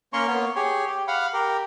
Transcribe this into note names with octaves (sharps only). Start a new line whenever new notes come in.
A#3 C#4 A#4 C#5 C6 C#6
A#3 B3 C#5
G4 G#4 C#5
G4
F5 F#5 B5
G4 A#4